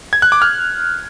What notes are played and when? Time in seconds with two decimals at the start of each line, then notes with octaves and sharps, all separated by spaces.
0.13 G#6
0.22 F#6
0.32 D6
0.42 F6